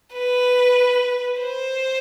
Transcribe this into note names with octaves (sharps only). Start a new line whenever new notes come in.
B4
C5